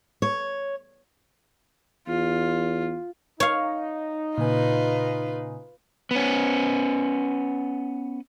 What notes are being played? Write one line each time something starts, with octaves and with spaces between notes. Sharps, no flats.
C#5
E2 F4
D#4 C#5 F5
A#2 C#3 F4 B4 G#5
B3 C#4